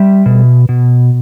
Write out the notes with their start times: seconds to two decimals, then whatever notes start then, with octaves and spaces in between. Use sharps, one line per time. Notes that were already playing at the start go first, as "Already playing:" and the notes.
Already playing: G3 E5
0.26 B2
0.69 B2